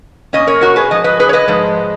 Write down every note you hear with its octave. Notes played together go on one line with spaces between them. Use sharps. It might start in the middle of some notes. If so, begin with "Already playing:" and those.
B2 A#3 C#4 D#5
A#4 C#5
F#4 A#4
G#4 B4
G#2 F3 D#5
B4 D#5
G#4 B4
C#5
B4 D#5
G#2 F3 G#3